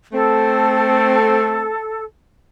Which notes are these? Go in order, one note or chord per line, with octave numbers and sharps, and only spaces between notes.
A3 C4 A4